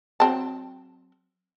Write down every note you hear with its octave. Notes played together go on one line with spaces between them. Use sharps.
F#3 C4 A5